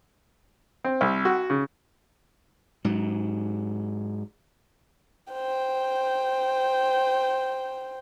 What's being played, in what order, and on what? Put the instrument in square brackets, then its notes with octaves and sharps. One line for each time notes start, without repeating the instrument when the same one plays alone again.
[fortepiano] C4
C2
F#4
C#3
[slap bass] G#2 F#3
[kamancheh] C5 G5